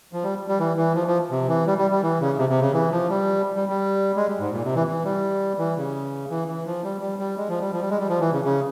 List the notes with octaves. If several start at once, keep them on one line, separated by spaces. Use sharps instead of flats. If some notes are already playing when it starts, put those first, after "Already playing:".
F3
G3
G3
E3
E3
F3
F3
C3
E3
G3
G3
G3
E3
C#3
C3
C3
C#3
E3
F3
G3
G3
G3
G#3
G3
G#2
A#2
C3
E3
E3
G3
E3
C#3
E3
E3
F3
G3
G3
G3
G#3
F3
G3
F3
G3
G#3
G3
F3
E3
C#3
C#3